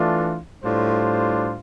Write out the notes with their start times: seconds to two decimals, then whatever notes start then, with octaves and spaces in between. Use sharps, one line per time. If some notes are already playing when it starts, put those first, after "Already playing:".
Already playing: E3 A3 D4 F4
0.63 A2 G3 D4 F4 C5